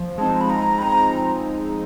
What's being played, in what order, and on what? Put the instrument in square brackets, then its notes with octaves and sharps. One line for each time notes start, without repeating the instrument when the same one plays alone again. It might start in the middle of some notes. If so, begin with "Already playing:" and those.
Already playing: [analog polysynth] F3
[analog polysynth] G#3 C4 D#4 [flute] A5
[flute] B5
[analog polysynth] F3 [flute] A#5
[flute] B5
[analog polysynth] G#3 C4 D#4 [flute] A#5